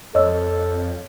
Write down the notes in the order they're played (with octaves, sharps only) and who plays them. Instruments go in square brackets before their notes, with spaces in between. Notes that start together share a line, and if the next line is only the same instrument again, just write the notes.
[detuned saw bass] F2 [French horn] A4 [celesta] C#5 [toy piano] D#5 E6